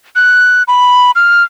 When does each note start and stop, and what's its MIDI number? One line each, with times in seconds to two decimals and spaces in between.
0.16 0.63 90
0.68 1.11 83
1.15 1.43 89